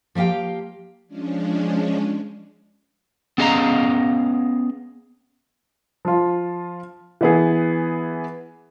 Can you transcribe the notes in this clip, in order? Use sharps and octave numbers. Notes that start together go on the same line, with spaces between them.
F3 A#3 G4 F5 G5
F3 G#3 C#4 D4
B3 C#4 G#4 D#5 F5 A#5
F3 F4
E3 B3 G#4